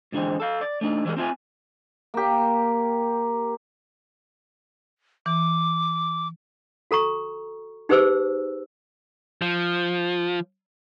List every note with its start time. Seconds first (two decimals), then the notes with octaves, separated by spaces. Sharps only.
0.12 G#2 D3 E3 G#3 C4
0.40 A4 F5
0.61 D5
0.81 A3 D4 D#4
1.05 E3 F3 G3 G#3 A#4
1.17 C4 F4 E5 G#5
2.14 A#3 G4
5.26 E3 D6
6.91 F#4 A4 A#5 C#6
7.89 D#4 G4 G#4 B4 C5 E6
9.42 F3